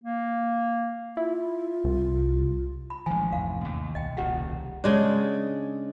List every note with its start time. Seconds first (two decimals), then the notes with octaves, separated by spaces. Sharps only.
0.04 A#3
1.17 E4 F4
1.84 C2
2.90 B5
3.06 A1 D#3 F3 G#3 G#5
3.33 E2 G2 C3 F5
3.64 D#2
3.95 C2 B2 D#5 G5
4.17 D#1 A#2 C#3 G4 F#5
4.84 C#3 G#3 D4